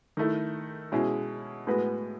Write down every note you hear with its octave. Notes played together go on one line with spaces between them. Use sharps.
D#3 A3 E4
B2 G#3 C#4 E4 G#4
A2 G#3 B3 F#4 B4